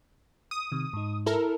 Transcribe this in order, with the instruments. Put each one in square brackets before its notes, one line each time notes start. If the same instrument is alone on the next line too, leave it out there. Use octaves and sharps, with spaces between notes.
[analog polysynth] D#6
[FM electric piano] C3 D#3
G#2 D#4
[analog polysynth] E4 A4 A#4